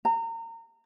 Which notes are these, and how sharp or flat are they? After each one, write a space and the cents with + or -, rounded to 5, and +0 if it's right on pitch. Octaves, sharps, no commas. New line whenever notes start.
A#5 -30